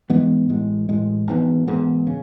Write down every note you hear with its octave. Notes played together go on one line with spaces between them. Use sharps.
G#2 E3 G#3 B3
A1 A2 G#3
A1 A2 G#3
G#1 G#2 E3 B3
G#1 G#2 E3 B3
C#3